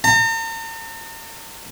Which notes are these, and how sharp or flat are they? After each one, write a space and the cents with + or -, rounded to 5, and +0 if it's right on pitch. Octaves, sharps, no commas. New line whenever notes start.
A#5 -45